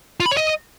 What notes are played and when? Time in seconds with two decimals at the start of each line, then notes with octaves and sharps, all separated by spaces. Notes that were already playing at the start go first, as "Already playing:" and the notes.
0.20 F4
0.26 B5
0.31 C#5
0.37 D#5